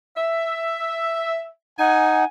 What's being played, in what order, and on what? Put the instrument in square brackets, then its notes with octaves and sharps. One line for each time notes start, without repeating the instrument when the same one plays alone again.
[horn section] E5
[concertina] D#4 [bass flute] F#5 [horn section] G#5